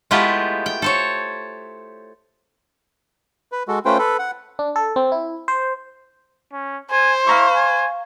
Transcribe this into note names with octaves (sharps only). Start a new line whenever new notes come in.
G#3 A3 B3 E4 F4 G4
G5
A4 C5 C#5
B4
G#3 F#4 A4
A3 C#4 F4 B4 C5 G5
A4 B4
F#5
D4
A4
C4
E4
C5
C#4
C5 G#5
E4 F5 A#5 C#6
G#5